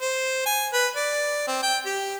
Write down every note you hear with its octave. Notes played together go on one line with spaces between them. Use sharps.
C5
G#5
B4
D5
C4
G5
G4